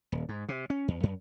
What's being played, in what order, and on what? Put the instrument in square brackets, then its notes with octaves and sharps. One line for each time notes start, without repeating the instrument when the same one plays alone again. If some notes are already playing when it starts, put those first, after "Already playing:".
[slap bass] D#1
G#2
C3
C#4
E2
F#2